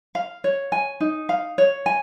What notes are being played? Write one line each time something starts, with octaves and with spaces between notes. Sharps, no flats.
F5
C#5
G#5
D#4
F5
C#5
G#5